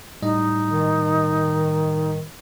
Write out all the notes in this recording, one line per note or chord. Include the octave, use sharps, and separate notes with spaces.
A2 G3 D#4 D#5
D#3